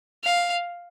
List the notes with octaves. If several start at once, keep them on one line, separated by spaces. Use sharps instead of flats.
F5